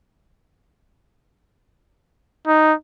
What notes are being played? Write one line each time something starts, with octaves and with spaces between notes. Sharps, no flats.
D#4